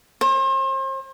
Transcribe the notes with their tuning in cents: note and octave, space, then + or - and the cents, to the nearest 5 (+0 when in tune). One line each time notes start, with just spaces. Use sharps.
C5 +40